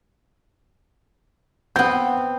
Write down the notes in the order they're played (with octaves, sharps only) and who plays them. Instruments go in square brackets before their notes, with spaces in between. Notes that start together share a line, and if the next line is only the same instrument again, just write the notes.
[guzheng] B3 C4 [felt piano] F#5 G6